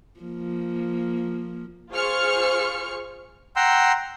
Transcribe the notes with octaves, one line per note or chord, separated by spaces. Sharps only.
F3 A#3
F4 G#4 C5 C#6 F6 C#7
F#5 G5 A#5 C6 E6